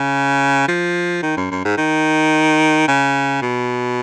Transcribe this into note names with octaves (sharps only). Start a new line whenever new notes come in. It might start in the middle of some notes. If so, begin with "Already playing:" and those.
Already playing: C#3
F3
D#3
F#2
F#2
G#2
D#3
C#3
B2